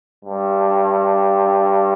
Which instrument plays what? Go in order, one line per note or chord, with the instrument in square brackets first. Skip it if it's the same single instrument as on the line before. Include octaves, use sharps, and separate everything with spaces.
[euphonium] G2